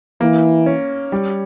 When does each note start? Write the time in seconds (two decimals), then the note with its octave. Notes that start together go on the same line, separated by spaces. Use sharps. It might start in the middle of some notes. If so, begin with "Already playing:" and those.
0.21 E3 A#3
0.66 C#4
1.12 G3